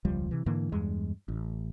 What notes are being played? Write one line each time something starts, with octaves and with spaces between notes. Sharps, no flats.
E1 C#2 F3 G3
C3 E3
G#2 D3 E3 A#3
E2 G2 G#3
A1